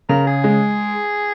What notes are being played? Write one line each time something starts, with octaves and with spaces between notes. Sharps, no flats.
C#3 A#4
G#4
G#3